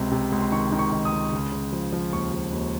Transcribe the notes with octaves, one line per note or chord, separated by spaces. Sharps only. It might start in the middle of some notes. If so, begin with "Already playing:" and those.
Already playing: C#2 C3
C3
C#2
C6
D#3 C#6
D#3
C#6
D#3
D#6
C#2
C#3
C#3
F3
F3
D#2 C#6
F3
D#2